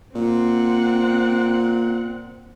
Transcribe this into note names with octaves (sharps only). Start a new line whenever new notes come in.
A#2 C4 F#5